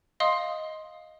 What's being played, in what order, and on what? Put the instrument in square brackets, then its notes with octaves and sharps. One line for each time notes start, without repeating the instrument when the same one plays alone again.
[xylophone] D#5 F5 C6 D#6